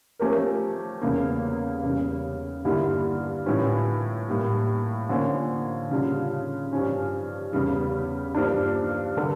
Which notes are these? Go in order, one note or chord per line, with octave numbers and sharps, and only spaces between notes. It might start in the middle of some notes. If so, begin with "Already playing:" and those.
F3 A3 C#4 G4 A#4
E2 C#3 G3 A#3
E2 C#3 G3
G2 D3 G3 A#3 E4
A2 E3 G3 C#4 F4
A2 G3 A#3
D3 F3 A#3 C#4
C#3 G3 D4 F4
G2 F3 C#4
E2 C#3 G3
G2 F3 A#3 D4
D3 G3 D4 A4